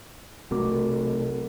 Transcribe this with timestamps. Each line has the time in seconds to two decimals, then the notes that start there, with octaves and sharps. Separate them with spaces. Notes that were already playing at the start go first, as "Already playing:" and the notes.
0.51 B1 C3 A3 C4 F#4 A#4 D6